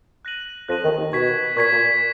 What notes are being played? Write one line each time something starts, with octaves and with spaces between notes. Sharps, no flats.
F#6 A#6 D#7 F#7
F2 F3 F#6 A#6 D#7 F#7
D#2 D#3
D#2 D#3
B2 C#6 G#6 B6
A#2 C#6 G#6 B6
A#2